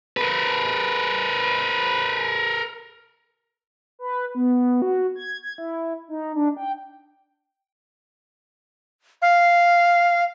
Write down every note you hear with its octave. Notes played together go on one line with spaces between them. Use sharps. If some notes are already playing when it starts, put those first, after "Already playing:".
A#4 B4
B4
B3
F#4
G#6
G#6
E4
D#4
D4
G5
F5